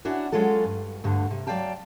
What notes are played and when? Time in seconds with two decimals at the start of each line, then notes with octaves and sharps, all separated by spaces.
0.05 C#4 D4 E4 F#4
0.32 F#3 G#3 C#4 F4 A4
0.64 G2
1.04 D2 G2 D3
1.30 C3
1.47 F#3 A3 D5 F5 G5 A5